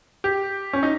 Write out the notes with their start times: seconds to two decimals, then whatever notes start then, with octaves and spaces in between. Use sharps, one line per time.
0.24 G4
0.73 C#4
0.83 D#4